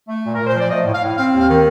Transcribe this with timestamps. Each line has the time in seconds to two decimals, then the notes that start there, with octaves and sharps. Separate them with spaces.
0.08 A3
0.24 A#2
0.35 A#2 A#4
0.47 C5
0.56 F3 D5
0.70 A3 D#5
0.85 A2
0.94 F5
1.02 A2
1.17 C4 F5
1.33 D#2
1.40 F5
1.48 D#3